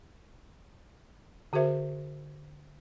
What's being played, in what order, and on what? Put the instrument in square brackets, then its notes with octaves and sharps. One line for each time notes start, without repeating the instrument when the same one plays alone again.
[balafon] D3 F#4 G#4 A#4 C5 E5